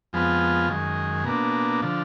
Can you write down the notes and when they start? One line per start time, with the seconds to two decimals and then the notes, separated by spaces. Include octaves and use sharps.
0.13 F2 F3 G#3 B3 F4
0.69 F#2 D#3 G#3
1.25 B2 A#3 D4
1.82 D3 F3